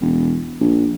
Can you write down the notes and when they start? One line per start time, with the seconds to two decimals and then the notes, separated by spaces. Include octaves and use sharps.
0.01 E1
0.61 A#1